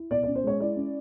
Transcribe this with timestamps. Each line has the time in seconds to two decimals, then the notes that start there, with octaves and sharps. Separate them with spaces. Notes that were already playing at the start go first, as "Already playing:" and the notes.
Already playing: E4
0.11 B2 D5
0.23 D5
0.27 C#4
0.35 C5
0.44 G#3 C#5
0.60 E4 D5
0.76 C#4